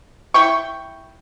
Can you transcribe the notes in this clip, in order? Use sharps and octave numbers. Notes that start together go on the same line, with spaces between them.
E4 G5 C#6